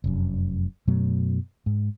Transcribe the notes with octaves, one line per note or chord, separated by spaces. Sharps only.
F1 F#2
F#2 B2 F#3 A3
G#2